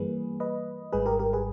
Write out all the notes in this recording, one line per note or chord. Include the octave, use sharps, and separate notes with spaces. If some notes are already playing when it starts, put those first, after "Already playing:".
Already playing: G2 E3 G3 A#3 G#4 B4
B4 D#5
G#1 G#2 G3 G#4 B4
G4 A#4
G4 A#4
G#4 B4